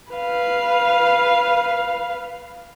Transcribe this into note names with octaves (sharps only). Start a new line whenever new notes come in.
B4 F5